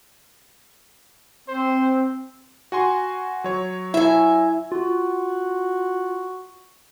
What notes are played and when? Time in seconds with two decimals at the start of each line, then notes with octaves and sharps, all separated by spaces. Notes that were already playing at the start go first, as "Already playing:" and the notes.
1.48 C4 C5
2.72 F#4 G#5 C6
3.44 F#3 C#5
3.94 E4 E5 G#5
4.72 F4 F#4